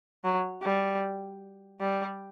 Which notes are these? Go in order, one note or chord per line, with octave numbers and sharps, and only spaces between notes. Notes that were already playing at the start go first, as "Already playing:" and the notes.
F#3
G3
G3